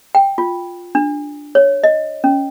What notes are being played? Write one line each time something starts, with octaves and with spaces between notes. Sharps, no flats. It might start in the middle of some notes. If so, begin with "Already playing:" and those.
G5
F4
D4
C#5
D#5
C#4